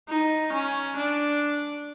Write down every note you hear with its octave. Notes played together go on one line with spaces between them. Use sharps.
D#4
C#4
D4